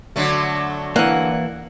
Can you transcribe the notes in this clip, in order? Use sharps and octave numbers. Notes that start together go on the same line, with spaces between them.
D3 F#3 A3
E3 A#3 F#5